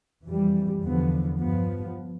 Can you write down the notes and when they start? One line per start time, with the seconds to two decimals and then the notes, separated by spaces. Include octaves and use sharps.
0.26 F2 E3 G3
0.82 E2 D3 F3 B3
1.39 G2 F3 B3